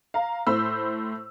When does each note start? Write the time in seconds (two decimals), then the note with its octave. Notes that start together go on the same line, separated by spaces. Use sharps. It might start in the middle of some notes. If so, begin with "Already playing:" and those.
0.14 F5 A#5
0.47 A2 C5 B5 E6